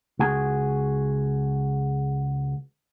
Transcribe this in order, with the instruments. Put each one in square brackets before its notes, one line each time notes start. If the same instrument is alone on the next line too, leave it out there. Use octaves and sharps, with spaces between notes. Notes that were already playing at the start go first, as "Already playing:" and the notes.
[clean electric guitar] C#2 F#4 G#4